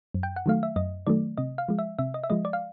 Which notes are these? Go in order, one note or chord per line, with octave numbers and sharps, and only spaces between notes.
F#2
G5
F#5
D#3 F#3 A3 F5
E5
F#2 D#5
D#3 F#3 A3 D5
C3 D#5
F5
F3 G#3
E5
C3 E5
D#5
E5
F3 G#3 D#5
D5
F5